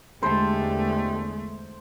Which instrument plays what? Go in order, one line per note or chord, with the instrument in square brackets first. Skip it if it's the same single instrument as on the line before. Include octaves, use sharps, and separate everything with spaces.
[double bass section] E2 D3 G#3 [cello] A3 [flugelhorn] G4 [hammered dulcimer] C5 A5